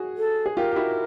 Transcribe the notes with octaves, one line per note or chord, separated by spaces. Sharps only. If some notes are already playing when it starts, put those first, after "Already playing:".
Already playing: F#4 G#4
A4
G#4
F4 G4 A#4
G4
E4 F#4